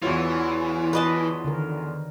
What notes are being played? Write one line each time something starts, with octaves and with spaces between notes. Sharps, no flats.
E2 E3 F4 F#4 C#5 F#5
B4 D#5 A5
D3 D#3 A#4